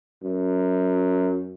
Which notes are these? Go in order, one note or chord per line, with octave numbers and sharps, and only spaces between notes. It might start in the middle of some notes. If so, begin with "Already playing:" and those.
F#2